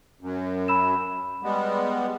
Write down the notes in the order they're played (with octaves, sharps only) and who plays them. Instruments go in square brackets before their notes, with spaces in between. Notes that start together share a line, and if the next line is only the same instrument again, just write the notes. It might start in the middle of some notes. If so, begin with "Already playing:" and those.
[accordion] F#2
[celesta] B5 E6 E7
[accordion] G3 G#3 B3